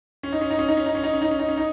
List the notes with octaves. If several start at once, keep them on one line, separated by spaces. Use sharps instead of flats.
C#4
D#4
C#4
D#4
C#4
D#4
C#4
D#4
C#4
D#4
C#4
D#4
C#4
D#4
C#4
D#4